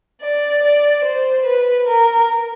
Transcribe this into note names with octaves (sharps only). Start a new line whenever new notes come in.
D5
D5
C5
B4
A#4